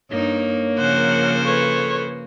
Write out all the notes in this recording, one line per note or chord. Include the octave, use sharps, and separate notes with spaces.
G2 A#3 D#4 C#5
C#3 F3 A#4 C5 F#5
A4 B4 C#5